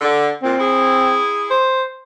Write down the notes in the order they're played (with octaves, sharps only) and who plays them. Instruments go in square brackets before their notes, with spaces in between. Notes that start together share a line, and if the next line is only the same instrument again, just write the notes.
[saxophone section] D3
[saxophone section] A#2 [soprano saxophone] C4
[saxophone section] E4 G#4
[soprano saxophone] C5